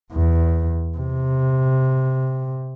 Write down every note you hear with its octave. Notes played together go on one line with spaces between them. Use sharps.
E2
C3